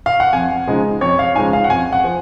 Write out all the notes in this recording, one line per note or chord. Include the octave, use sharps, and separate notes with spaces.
F5
F#5
F2 G#5
C#3 F3 G#3 D#4
F2 C#5
F5
C#3 F3 G#3 D#4 G#5
F5
F#5
F2 G#5
F#5
F3